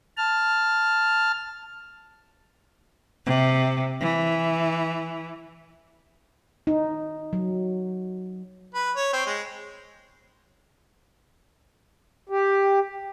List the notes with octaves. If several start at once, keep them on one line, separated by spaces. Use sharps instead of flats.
A5 F6
C3
E3
D#4
F#3
B4
C#5
C4
G#3
G4